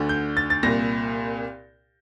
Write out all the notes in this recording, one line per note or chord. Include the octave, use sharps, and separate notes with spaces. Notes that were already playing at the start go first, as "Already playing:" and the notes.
Already playing: D2 D3
G6
A6
A6
C2 A#2 A#6